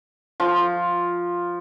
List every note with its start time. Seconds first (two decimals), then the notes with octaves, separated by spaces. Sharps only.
0.40 F3